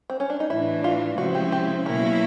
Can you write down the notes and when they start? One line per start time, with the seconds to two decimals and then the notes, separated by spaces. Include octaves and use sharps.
0.10 C4
0.20 C#4
0.30 D4
0.40 D#4
0.50 A2 E3 A3 D4 E4
0.84 F4
1.18 C#3 F3 G#3 C4 E4 F#4
1.35 G4
1.52 G4
1.86 B2 F#3 A#3 C#4 E4 A#4